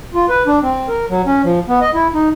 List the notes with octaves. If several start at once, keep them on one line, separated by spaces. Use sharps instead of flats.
F4
B4
D4
C4
A#4
F#3
C#4
F3
B3
D#5
E4
D#4